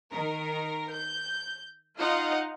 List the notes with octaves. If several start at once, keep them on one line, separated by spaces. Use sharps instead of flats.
D#3 A#4
G6
D#4 F4 D#5 F5 F#5